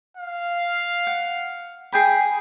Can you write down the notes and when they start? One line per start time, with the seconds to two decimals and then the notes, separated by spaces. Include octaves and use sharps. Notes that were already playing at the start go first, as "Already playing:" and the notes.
0.17 F5
1.07 F#5
1.92 G#4 G5 B5